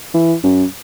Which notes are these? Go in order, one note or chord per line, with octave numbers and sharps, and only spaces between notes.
E3
F#2